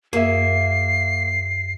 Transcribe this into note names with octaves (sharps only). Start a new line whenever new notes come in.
F#2 A#3 G#4 E5 C7